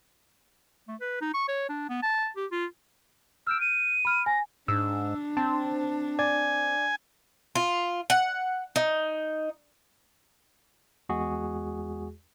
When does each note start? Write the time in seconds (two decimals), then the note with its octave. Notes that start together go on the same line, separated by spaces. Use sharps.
0.88 A3
1.01 B4
1.21 D#4
1.34 C#6
1.48 C#5
1.69 D4
1.89 B3
2.02 A5
2.36 G4
2.52 F4
3.47 E6 F6 G6 D7
3.61 D#7
4.05 B5 F6
4.26 G#5 A#6
4.68 G#2 D4 E6
5.37 C4 A5
6.19 D5 G#5
7.55 F4
8.10 F#5
8.76 D#4
11.09 E2 G#3 F#4 G#4